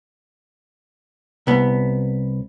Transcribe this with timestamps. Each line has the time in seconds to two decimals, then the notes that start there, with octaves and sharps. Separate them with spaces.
1.47 C2 B3